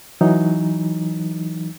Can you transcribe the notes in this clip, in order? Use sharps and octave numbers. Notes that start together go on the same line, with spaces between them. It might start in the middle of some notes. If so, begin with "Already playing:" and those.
E3 F#3 D#4